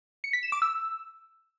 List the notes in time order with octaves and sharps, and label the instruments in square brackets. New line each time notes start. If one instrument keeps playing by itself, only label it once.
[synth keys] C#7
B6
E7
D6
E6